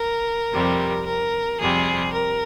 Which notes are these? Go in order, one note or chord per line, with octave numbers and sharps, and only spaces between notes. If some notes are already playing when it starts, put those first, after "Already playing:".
Already playing: A#4
F2 C3 G3
A#4
F2 C3 G3 G#4
A#4